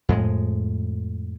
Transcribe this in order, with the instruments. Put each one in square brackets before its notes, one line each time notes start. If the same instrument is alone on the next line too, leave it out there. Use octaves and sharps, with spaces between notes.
[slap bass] F2 A2 G#3